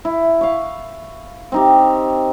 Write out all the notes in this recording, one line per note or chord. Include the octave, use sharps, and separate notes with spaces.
E4
F5 C#6
C4 D#4 G4